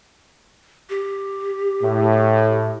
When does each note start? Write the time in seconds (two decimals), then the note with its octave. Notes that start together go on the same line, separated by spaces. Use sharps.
0.90 G4
1.83 A2